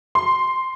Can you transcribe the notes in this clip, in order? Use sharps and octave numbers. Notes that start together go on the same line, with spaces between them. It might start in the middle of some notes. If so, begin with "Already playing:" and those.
C6